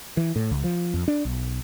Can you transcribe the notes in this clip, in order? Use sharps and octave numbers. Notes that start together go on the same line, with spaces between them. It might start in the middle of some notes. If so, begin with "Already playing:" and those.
E3
A2
C#2
F3
F2
D4
B1